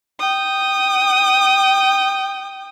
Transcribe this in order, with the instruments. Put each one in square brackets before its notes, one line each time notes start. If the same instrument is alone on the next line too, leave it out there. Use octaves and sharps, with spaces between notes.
[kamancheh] G5 D#6